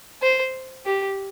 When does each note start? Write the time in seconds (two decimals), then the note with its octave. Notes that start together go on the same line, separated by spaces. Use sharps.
0.22 C5
0.86 G4